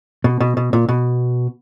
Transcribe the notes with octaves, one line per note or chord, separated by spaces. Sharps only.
B2
B2
B2
A#2
B2